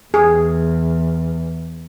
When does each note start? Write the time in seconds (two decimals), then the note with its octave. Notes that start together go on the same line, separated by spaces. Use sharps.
0.14 E2 G#4